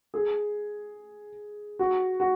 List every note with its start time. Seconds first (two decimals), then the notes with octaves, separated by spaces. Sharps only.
0.14 G#4
1.79 F#4
2.20 F#4